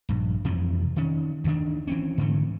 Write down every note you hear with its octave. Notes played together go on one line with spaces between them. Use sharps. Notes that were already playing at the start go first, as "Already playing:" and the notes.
A#1 G2
F2 C3 E3 F3
D#3 C#4
D2 D#3 D4
E3 C4 C#4
G#2 D3 E3 A3